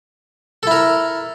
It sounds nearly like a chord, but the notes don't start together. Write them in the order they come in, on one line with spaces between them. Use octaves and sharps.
A4 E4 A#4